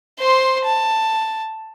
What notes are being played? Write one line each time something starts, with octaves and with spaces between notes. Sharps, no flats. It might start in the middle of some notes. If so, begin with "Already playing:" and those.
C5 C6
A5